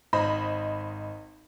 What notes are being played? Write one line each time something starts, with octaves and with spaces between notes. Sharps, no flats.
G#1 C5 D#5 B5